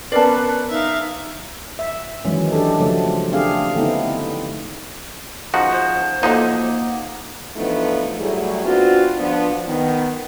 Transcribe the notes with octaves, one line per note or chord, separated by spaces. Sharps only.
B3 C#4 A#4 B4 D5 A5 C7
D#4 E5 F5
E5
D#3 E3 F#3 G#3 C#4
D4 G4 A4
C#3 F3 F#3 A3
A3 C4 D4 G4 G#4 F5
D3 A3 B3 C4 D#4 E4
C#3 F3 D#4 F#4 F#5
C5
F3 F#3 A3 A#3 D#4
E3 F3 A3 B3 D4 D#4
F#3 G3 A3 E4 G#4
B3 C4 D4 F4 F#4
F3 B3 D4
D#3 B3